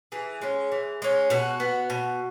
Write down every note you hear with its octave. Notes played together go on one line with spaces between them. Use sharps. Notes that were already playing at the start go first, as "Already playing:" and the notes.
E3 G#4
G#3 C#4
E3
G#3 C#4
B2 F#4
B3
B2